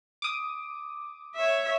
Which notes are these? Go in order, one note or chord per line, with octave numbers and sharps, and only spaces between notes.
D6 D#6
C#5 E5